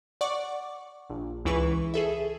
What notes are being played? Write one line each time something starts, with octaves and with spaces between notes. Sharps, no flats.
D5 F#5 C#6 D6
A#1
C#2 E3 E4 B4 C#6
G#4 A4 E5